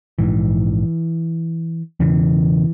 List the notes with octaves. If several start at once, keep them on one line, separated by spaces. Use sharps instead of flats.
A#1 G#2 E3
E1 E2 C#3 E3